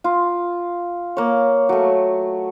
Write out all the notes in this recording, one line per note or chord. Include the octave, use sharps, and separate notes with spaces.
F4
A#3 C#5
F#3 A3